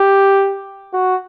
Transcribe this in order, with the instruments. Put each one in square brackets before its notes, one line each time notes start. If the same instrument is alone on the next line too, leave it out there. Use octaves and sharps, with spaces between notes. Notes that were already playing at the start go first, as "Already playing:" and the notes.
Already playing: [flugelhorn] G4
F#4